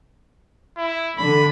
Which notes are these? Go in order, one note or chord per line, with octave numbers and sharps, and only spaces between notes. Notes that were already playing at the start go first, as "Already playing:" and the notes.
E4
D3 B5